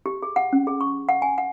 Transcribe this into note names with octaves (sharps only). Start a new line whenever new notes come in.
G4
G#4
F#5
C#4
G#4
C#6
F#5
G#5
F#5